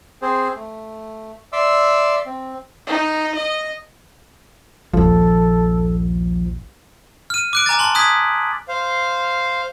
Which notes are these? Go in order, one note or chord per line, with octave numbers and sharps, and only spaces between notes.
C4 G#4 C5
A3
D5 E5 C6 D6 E6
C4
D#4
D#5
A#1 D#2 F3 A4
F6 D#7
D6 F#6 D7
G#5 A#5 D6 A6
A5 C6 F#7
D#6 F#6 G#6 B6
C5 F5